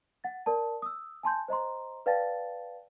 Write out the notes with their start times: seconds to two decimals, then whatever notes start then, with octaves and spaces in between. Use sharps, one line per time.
0.24 F#5 A6
0.46 A#4 D5 A5
0.82 D#6 E6
1.23 G#5 A5 C6 G6
1.48 C5 D#5 A#5 C6
2.06 B4 D5 F5 G5 A5 A6